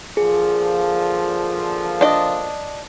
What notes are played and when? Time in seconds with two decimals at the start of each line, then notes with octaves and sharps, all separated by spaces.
0.17 A#2 D3 F3 G#4
2.01 D4 D#5